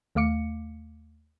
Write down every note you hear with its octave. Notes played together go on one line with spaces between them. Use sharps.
D#2 A3 F5 D6 C#7